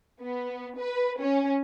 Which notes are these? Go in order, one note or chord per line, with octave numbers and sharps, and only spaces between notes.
B3
B4
C#4